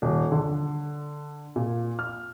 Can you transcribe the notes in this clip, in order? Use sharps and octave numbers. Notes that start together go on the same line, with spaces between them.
D#1
D3
A#2
F6